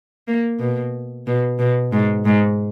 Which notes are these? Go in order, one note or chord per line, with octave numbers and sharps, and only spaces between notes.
A#3
B2
B2
B2
G#2
G#2